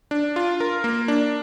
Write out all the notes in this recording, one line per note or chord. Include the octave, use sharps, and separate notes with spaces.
D4
F4
A#4
A#3
D4